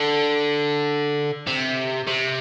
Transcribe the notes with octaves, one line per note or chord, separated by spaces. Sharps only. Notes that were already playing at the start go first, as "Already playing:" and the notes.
Already playing: D3
C3
C3